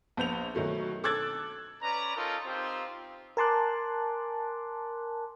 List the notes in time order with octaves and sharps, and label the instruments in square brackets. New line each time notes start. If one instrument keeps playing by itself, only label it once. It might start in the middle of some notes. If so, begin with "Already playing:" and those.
[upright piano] A#1 B3 G6 F7
B2 D#3 F#3 A3
A4 D6 E6 F#6 G#6 A6
[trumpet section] C#4 B4 D5 A#5
C#4 D#4 F4 A4 A#4
C4 D#4 F4 G4 C5
[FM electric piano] A#4 G#5 A5 C6 D6 F#6